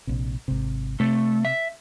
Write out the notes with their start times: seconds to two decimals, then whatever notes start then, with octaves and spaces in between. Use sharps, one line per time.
0.07 A#1 C3
0.48 G#1 C3
1.00 C3 A3
1.45 E5